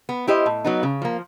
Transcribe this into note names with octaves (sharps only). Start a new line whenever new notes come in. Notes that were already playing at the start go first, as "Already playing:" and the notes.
B3
E4 G4 C5 D#5
A2
F#3 B3 D#4
C#3
F3 A#3